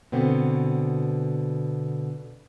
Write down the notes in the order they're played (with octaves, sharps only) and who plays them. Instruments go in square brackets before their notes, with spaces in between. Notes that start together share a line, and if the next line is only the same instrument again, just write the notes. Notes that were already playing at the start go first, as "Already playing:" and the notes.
[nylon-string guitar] B2 D3 B3 C4